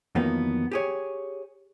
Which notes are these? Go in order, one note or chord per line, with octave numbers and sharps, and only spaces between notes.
F2 D#3 E3 F#3 A#3 B3
G4 G#4 C#5